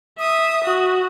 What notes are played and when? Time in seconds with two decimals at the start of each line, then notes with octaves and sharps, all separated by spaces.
0.19 E5 D#6
0.65 F#4